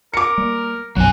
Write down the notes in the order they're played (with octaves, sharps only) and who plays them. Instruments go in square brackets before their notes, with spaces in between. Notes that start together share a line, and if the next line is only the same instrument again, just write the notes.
[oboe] A#4 [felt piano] D6 C#7
[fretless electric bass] G3 A#3
[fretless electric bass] B1 F#2 C3 [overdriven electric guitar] F#3 G#5 [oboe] F#5